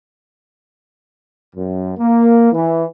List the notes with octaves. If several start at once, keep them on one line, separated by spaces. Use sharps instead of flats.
F#2
A#3
E3